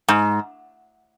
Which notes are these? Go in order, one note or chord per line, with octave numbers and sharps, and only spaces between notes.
G#2